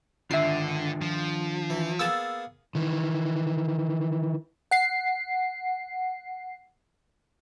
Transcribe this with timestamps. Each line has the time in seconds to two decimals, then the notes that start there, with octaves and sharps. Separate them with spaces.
0.31 D3 D#3 D4 F4 E5 C7
1.01 F3
1.70 E3
1.99 A#3 B3 G#4 E6 A6
2.75 D#3 E3
4.71 F#5 C7